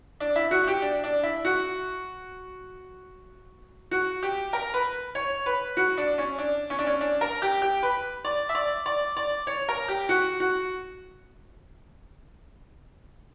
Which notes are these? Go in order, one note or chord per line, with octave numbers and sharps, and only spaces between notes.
D4
E4
F#4
G4
D4
D4
E4
F#4
F#4
G4
A#4
B4
C#5
B4
F#4
D4
C#4
D4
C#4
D4
C#4
D4
A#4
G4
G4
B4
D5
E5
D5
D5
D5
C#5
A#4
G4
F#4
F#4